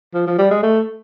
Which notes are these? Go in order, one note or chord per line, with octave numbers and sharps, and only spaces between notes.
F3
F3
G3
G#3
A3